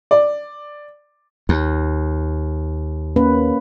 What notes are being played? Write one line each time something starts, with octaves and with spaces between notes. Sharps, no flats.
D5
D#2
A#3 C#4 B4